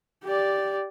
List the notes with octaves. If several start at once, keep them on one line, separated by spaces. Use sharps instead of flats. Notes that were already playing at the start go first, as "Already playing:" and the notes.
G4 D5